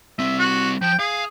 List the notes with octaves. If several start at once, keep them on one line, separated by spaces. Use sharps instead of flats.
G3 C4 E5
F#4
F3 G5
G#4 F5